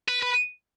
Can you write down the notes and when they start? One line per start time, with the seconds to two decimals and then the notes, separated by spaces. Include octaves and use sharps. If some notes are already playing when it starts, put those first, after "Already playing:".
0.09 B4
0.23 B4